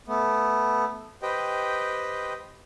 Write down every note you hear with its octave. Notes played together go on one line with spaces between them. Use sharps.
A3 B3
G4 B4 C5 D#5 G5